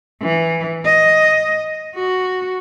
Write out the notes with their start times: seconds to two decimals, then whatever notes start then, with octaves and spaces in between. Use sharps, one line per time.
0.22 E3
0.85 D#5
1.95 F#4